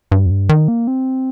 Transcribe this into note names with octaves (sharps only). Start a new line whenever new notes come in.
G2
F2
G2
D#3
A#3
C4